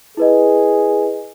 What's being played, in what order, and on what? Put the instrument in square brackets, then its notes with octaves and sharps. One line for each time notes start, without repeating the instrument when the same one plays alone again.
[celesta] E4 B4 D#5 [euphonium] G#4